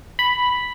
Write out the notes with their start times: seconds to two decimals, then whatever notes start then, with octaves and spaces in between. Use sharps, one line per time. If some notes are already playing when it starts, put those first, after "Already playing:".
0.19 B5